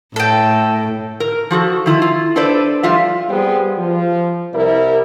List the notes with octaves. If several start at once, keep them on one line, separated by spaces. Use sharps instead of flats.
A2 A4 G5
A#4
F3 F#4 G#4 A4
D#3 E4 F4
F4
D4 A4 B4 C5 D5
F3 G3 F4 E5
G3 B3 C4 G#4
F3
C2 G3 E4 A#4